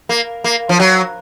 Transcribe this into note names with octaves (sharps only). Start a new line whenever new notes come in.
A#3
A#3
F3
F#3